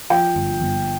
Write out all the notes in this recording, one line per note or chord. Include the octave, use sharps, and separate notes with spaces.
F3 G5
G1
G1